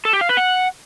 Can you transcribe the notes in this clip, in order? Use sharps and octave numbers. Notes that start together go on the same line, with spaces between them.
A4
G4
F5
B4
F#5